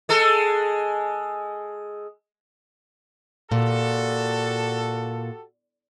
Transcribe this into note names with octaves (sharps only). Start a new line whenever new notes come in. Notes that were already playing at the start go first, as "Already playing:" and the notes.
G#3 A4
A#2 F#4 G4 A4